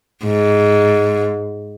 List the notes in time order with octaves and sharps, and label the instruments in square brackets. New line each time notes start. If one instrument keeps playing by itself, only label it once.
[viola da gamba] G#2